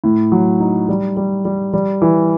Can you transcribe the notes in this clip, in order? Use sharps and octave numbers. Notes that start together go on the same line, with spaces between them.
A2
F#3
D#4
G3
G3
G3
G3
E3